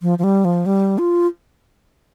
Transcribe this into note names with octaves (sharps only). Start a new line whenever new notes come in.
F3
F3
G3
F3
G3
F4